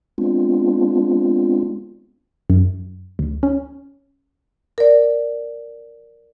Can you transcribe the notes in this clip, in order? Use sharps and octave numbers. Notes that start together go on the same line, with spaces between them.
G#3 B3 C4 D4 F4
F#2
D2
C#4
A#4 D5